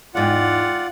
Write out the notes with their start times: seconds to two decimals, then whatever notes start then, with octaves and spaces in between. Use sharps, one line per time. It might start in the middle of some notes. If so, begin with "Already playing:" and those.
0.15 E2 G#2 F4 D5 F#5 G5